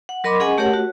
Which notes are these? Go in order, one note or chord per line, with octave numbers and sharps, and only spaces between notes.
F#5
F#3 A#4 D#5 B5 C6 D6
C#4 G#4 D#5 F#5 G#5
A3 G4 A#4 C#5 F#5
F#4